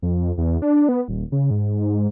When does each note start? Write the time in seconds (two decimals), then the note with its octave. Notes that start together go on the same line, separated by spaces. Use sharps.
0.02 F2
0.38 E2
0.62 D4
0.89 B3
1.08 D#1
1.32 C#3
1.51 G#2
1.81 G#2